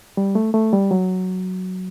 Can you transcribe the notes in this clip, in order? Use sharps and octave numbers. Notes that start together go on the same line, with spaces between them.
G3
A3
A3
G3
F#3